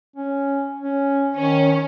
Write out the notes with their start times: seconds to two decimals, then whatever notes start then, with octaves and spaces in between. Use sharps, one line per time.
0.16 C#4
0.80 C#4
1.35 D#3 C#4